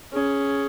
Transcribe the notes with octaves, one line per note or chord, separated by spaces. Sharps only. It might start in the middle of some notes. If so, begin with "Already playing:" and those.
C#4 G#4